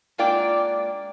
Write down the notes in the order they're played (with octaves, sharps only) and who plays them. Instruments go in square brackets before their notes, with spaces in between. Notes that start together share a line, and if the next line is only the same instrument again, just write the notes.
[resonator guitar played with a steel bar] G#3 A#3 D4 F4 D5 G5